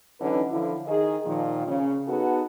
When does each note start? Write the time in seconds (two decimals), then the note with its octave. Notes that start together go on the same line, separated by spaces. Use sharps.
0.20 D3 E3 F#3 C#4 D#4 B4
0.50 D3 F3 E4
0.87 D#3 G#4 D#5
1.25 A#2 D#3 F3
1.66 C#3 C#4
2.08 B3 D#4 F#4 G#4 A4